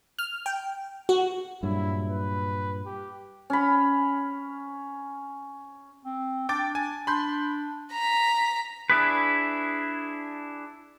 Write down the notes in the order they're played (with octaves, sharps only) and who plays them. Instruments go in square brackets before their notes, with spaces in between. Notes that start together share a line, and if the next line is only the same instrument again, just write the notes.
[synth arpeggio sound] F6
G5
F#4
[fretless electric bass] G2 A#2 F#3 [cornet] E4
[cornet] B4
G4
[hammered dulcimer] C#4 B5
[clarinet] C4
[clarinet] D4 [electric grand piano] G5 D6 A6
[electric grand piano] G#5
[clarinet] D4 [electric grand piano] B5 C6 G6
[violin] A#5 B6
[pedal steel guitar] D4 E4 G#4 B4